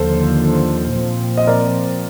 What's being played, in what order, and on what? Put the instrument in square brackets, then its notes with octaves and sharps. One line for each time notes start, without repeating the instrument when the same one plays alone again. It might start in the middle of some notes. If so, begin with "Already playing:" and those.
Already playing: [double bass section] D#2 D3 F3 [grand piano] A4 C5
[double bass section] A#2 F3 C4
[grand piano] D#5
A#4 D5